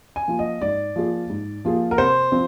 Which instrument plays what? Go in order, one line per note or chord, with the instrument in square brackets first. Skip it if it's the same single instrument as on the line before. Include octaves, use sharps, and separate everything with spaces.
[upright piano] G#5
[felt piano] F3 A#3 F4
[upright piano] D#5
[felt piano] G#2 [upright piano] D5
[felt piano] F3 A#3 F4 G#4
G#2
F3 A#3 F4 G#4
[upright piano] A#4
[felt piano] C3 [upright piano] C5
[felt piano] F3 C4